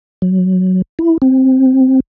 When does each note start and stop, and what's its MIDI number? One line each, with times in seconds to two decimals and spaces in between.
0.22 0.82 54
0.99 1.18 64
1.22 2.00 60